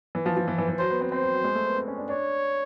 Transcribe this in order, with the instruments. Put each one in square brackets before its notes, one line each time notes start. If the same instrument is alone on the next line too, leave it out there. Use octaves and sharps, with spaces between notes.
[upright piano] E3
F3
F3
E3
E3
E3
[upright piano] F#3 [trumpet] C5
[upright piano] B3
C4
[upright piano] C4 [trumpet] C5
[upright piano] F#3
F#3
G#3
A3
B3
C4
C#4
D4
[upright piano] D4 [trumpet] C#5